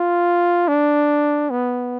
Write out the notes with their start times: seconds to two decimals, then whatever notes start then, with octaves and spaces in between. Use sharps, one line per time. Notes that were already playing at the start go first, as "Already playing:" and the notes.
Already playing: F4
0.68 D4
1.50 B3